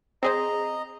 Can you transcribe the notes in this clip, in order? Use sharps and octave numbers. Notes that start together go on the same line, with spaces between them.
C4 G#4 C5 D#5 A#5